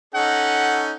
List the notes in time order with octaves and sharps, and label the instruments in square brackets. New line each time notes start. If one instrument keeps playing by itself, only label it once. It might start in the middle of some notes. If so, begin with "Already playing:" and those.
[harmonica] C#4 D#4 A4 [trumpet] F#5